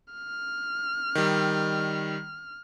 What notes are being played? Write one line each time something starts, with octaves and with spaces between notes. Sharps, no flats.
F6
D#3 G3